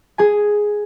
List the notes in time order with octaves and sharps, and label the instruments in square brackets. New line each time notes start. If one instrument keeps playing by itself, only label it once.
[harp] G#4 G#5